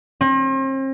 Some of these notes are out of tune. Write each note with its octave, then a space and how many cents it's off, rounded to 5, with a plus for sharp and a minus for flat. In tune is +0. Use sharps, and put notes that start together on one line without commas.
C4 +40